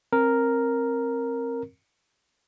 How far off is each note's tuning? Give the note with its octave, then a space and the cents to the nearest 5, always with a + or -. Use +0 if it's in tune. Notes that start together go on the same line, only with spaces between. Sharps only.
C4 +25 A#4 +0